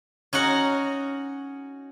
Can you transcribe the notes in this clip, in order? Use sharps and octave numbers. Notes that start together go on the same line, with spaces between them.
C#4 D#4 F#4 F#5